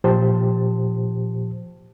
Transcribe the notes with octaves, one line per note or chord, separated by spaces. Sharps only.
A#2 F3 G4 C5 A5